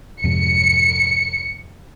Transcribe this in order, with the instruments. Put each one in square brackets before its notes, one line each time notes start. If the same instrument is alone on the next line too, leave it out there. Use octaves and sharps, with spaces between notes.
[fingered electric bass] F2 G#2 C3 [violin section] C#7